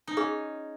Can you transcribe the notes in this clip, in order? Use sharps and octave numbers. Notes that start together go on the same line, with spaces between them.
D#4
C#4 G#4